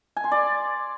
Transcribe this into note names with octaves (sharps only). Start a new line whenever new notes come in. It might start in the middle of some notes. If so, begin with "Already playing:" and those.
G#5
C6
D5